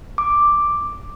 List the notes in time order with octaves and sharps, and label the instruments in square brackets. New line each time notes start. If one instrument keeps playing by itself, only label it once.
[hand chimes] D6